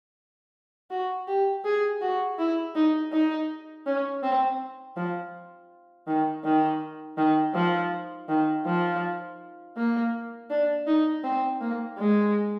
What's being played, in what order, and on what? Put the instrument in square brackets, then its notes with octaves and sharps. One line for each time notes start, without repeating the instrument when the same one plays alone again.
[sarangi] F#4
G4
G#4
F#4
E4
D#4
D#4
C#4
C4
F3
D#3
D#3
D#3
F3
D#3
F3
A#3
D4
D#4
C4
A#3
G#3